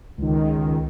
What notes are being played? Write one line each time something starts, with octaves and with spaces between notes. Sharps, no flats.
C#2 D#3